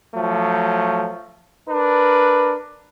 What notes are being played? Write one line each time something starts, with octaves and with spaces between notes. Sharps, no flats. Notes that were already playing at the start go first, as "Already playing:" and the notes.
F3 F#3 A3
D4 A#4 B4